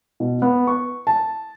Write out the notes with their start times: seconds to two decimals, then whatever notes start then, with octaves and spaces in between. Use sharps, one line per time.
0.20 B2
0.42 B3
0.67 C#6
1.07 A5